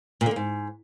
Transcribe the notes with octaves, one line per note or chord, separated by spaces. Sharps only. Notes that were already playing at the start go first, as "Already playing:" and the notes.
A#2
D3
A#3
G#2